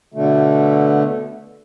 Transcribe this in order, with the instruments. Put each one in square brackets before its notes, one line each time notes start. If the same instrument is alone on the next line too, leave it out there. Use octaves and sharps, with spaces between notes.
[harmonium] B2 D3 A3